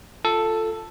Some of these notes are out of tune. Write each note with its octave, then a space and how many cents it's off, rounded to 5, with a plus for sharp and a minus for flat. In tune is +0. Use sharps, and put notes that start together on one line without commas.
F4 +0 A4 +5